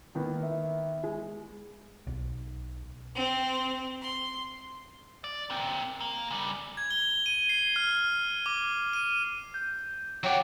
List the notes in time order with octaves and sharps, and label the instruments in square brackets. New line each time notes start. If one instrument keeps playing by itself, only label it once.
[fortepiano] D#3 A#3 B3
[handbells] E5
[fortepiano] G#3
[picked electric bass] B1
[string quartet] C4
C6
[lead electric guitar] D5
A#2 C4
A#3
C#3 G3
[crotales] G#6
G7
D#7
C7
F6
D6
D#7
[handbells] G6
[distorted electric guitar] F#3 D5 [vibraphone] C#5 [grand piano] F#5 G5